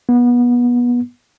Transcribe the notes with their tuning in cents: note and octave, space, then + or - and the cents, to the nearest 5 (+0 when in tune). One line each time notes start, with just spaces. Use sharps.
B3 -25